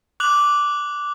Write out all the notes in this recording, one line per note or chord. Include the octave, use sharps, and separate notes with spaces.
D6 F#6 F7 F#7